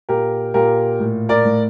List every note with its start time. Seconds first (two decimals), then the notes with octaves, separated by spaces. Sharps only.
0.09 A#2 G4 A#4
0.54 A#2 G4 A#4
1.00 A2
1.29 A#4 D5
1.44 A2